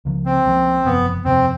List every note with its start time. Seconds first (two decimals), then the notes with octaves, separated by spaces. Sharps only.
0.05 C#2 C#3 F3 A#3
0.26 C4
0.45 C#2 C#3 F3 A#3
0.85 F#1 E2 C3 F3 B3
1.25 F#1 E2 C3 F3 C4